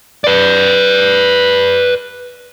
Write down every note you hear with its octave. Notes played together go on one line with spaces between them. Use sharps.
B4 D5